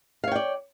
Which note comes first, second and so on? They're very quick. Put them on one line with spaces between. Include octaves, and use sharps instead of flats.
F5 C#5 G5 D5